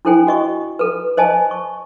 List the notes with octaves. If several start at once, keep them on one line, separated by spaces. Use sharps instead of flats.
D4 E4 A4 C5 G5 G#5
F#4 D#5 C#6
A4 B4
C5 D#5 G#5 A5
C#6